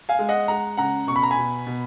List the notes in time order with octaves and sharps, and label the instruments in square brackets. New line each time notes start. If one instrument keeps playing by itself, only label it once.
[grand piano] F5 G#5
G#3
D#5 F#5
G#3 F#5 A#5
C#3 F#5 A#5
B2 C#6
B5
A#5
G#5 B5
B2
B2